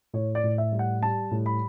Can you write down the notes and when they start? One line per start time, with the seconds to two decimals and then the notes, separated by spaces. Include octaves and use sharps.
0.13 A2 C#5
0.35 D5
0.44 A2
0.58 E5
0.72 G3
0.79 F#5
1.02 G3 A5
1.31 A2
1.46 B5